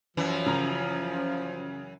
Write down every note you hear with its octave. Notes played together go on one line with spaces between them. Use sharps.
F#2 E3 F3 E4
C#3 A#5